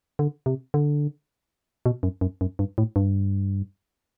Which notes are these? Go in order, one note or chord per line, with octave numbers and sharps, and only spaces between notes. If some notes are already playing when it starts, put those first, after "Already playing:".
D3
C3
D3
B2
F#2
F#2
F#2
G2
A2
G2